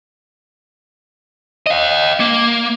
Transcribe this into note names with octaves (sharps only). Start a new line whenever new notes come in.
D#5 F5
A#3